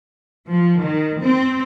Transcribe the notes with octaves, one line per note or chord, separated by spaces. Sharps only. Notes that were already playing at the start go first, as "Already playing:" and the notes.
F3
D#3
C4